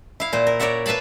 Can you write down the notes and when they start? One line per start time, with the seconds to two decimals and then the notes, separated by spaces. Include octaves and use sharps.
0.20 E4 F5
0.33 A#2 C5
0.47 A#4
0.60 A#4 C#5 D5 E5 F#5
0.86 B4 E5 F5 A5 B5